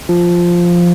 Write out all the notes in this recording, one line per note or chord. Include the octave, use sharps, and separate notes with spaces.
F3